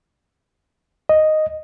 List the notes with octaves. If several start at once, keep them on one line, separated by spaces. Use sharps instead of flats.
D#5